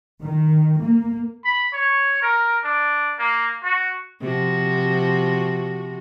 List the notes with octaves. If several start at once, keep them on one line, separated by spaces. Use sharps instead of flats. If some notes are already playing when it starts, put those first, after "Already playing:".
D#3
A#3
B5
C#5
A#4
D4
A#3
F#4
C3 F3 F#4